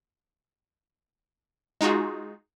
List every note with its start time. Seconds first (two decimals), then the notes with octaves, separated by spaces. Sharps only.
1.81 G#3 D#4 F4 F#4 G#4